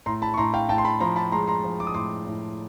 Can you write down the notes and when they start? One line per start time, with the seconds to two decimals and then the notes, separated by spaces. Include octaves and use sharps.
0.06 A2 A#5 C6
0.22 A5 B5
0.34 C#6
0.38 A2 A#5 C6
0.54 F5 G5
0.69 A2 G5 A5
0.78 C6
0.85 A5 B5
1.00 F3 A#5 C6
1.16 A5 B5
1.32 G#3 A#5 C6
1.48 A#5 C6
1.64 F3
1.80 D6
1.87 D#6
1.94 A2 C6 D6
2.27 A2